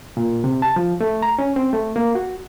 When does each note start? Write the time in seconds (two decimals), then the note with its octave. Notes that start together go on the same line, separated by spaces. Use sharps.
0.17 A#2
0.44 C3
0.62 A5
0.76 F3
1.01 A3
1.22 A#5
1.39 C#4
1.56 C4
1.73 A3
1.96 A#3
2.15 F#4